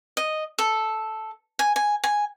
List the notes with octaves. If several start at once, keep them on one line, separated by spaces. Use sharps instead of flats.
D#5
A4
G#5
G#5
G#5